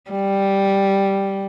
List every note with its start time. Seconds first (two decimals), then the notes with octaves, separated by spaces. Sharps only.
0.11 G3